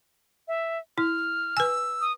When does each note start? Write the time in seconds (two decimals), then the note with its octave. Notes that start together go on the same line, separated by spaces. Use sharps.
0.48 E5
0.98 E4 F6
1.57 B4 G#5 E6
2.01 D#6